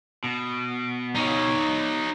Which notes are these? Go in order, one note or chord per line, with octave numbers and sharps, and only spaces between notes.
B2
D#4 C#5